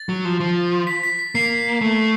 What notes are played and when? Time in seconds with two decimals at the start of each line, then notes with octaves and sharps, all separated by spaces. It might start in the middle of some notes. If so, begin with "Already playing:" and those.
Already playing: A6
0.09 F#3
0.25 F3
0.40 F3
0.87 B6
1.03 B6
1.19 B6
1.35 A#3 C7
1.81 A3